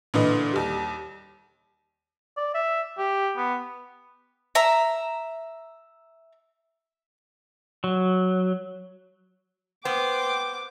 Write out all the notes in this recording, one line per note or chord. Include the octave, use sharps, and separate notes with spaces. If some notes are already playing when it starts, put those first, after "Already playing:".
A#2 D3 E3 B4 D#5
D#2 G3
D5
E5
G4
B3
E5 A#5
F#3
B3 C5 G5 D6